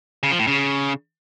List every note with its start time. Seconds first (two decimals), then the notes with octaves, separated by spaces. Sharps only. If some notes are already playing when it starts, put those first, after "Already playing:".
0.23 C#3
0.31 F3
0.39 A2
0.47 C#3